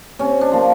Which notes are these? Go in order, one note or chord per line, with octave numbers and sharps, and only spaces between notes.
C3 C#4
D4
F3 A#3